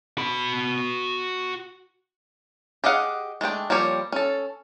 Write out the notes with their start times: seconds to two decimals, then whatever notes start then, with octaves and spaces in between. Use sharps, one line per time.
0.18 F#4 B5
2.84 G4 G#4 D#5 F5 F#5
3.41 G#3 A3 D4 G5
3.70 F3 G3 A#3 G4 C#5
4.12 C#4 A4